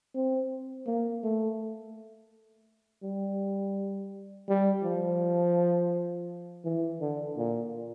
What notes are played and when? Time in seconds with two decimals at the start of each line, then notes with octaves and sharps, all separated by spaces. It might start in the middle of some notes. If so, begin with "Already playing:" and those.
0.15 C4
0.86 A#3
1.23 A3
3.03 G3
4.48 G3
4.84 F3
6.65 E3
7.01 D3
7.37 A#2